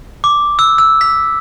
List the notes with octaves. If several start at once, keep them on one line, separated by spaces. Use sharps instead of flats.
D6
E6
E6
B6